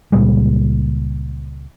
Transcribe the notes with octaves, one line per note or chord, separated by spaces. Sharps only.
C#2 A#2 G3 G#3